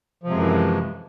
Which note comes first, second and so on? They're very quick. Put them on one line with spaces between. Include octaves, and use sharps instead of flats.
F3 C3 G#3 F#2 E3